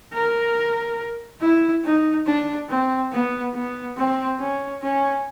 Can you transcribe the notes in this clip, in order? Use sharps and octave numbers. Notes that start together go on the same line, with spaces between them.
A#4
E4
D#4
D4
C4
B3
B3
C4
C#4
C#4